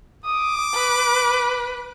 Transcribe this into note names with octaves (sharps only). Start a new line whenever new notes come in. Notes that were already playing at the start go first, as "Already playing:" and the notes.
D6 D#6
B4